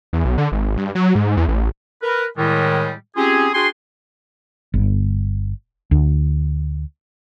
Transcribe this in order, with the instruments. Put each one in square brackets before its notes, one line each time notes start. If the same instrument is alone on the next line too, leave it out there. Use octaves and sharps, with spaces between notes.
[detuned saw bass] E2
B1
D3
G#1
G2
F#3
G#2
E2
A1
[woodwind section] A#4 B4
A2 D#3 G3 G#3
C4 C#4 F4 G4 G#4
D4 F#4 G#4 G5 G#5 C6
[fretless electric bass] G1
D2